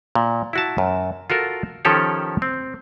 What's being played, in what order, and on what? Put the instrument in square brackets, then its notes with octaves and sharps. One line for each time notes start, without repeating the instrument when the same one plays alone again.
[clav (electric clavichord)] A#2
E4 F#4 A5
F#2
F4 F#4 A4 A#4
D#3 F3 C#4 G4 A4 C#5
C4